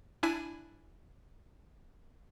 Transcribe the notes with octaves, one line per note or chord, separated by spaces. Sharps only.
D4 E4 G#5 B6 D#7